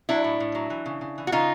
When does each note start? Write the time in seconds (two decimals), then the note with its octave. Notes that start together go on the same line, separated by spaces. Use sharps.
0.09 F#3 D4 E4
0.24 A2
0.40 A2
0.55 F#3
0.70 E3
0.86 C#3
1.01 C#3
1.18 E3
1.27 F#4
1.32 C#3 D#4 F4